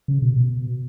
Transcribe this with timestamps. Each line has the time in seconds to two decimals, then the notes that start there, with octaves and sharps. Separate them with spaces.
0.08 C#3
0.22 B2
0.36 B2